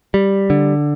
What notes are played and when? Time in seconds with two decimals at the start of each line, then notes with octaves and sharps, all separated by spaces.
0.14 G3
0.50 D3